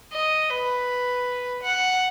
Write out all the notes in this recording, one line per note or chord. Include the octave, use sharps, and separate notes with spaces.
D#5
B4
F#5